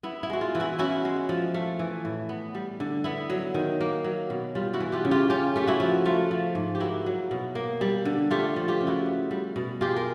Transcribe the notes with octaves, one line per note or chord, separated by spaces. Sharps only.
B3 E4
E4
G#3 F#4
F4
E3
E4 F#4
C#4 E4 F#4
G#3
F3
A3
E3
A2
B3
G3
D3
B3 E4
F#3
D#3
A#3
F#3
B2
G3 F4
E4 F#4
E3
F4 G4
C#3
F4 G4
C#4 F4 G4
A3 G4
E4 F#4
F3
A3 F4
F3
G#2
G4
A#3 E4 F#4
F#3
B2
A#3
G3
D3
A3 F4 G4
F3
F4 G4
C#3
E4 F#4
B3
G3
B2
G#3 F4 G4
A#4